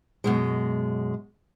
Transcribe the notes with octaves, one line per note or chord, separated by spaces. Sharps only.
F#2 B2 G#3